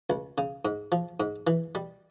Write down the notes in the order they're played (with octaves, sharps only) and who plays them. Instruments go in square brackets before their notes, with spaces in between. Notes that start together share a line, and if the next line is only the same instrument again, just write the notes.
[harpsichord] C#2
C#3
G#2
F3
G#2
E3
G3